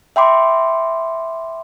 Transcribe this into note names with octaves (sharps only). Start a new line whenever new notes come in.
E5 G5 B5 C6 D6